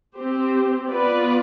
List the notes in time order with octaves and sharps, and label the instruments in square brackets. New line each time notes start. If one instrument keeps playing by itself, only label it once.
[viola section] C4 G4 C5
B3 F4 B4 D5